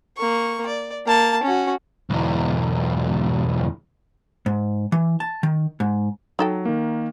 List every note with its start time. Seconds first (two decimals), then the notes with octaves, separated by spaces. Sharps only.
0.17 A#3 C#6
0.67 D5
1.06 A#3 A5
1.43 C#4 F#4
2.10 B1 E2
4.46 G#2
4.92 E3
5.20 A5
5.43 D#3
5.80 G#2
6.39 F#3 D#4 A4 G5
6.65 D#3 A#3